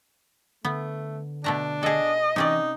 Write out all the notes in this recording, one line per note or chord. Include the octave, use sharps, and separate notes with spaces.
D3 A3 B3
B2 A3 D4 A#5
G#4 A4 D#5
C3 E3 C#4 D#4 D5